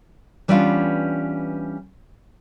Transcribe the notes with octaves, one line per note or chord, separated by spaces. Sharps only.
E3 G3 B3 C#4 D4 F4